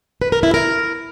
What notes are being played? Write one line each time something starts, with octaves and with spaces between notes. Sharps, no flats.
B4
A#4
E4
A#4